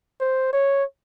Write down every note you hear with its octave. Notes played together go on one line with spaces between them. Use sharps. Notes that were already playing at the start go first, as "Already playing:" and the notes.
C5
C#5